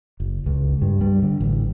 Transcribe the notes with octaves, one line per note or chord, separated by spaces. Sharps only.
F#1
C#2
G2
G3
D3
A1